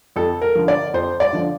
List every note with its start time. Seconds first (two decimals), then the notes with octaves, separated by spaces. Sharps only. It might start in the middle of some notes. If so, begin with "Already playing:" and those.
0.16 F2 A4
0.42 A#4
0.55 D3 F3
0.68 D5
0.93 F2 C5
1.20 D5
1.33 D3 F3